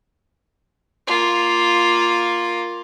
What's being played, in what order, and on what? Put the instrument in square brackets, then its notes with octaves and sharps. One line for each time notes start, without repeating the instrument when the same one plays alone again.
[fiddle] A#3 F4